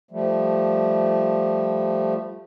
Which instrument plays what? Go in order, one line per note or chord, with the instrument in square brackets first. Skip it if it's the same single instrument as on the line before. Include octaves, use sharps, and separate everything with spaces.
[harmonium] F3 G3 A3